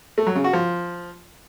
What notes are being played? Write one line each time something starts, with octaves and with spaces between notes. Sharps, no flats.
A3
F#3
C#3
F#4
F3